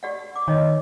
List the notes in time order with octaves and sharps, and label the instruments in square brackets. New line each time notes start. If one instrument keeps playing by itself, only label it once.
[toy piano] G4 D5 F#5
D6
[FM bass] D#3 [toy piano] C#5 D#5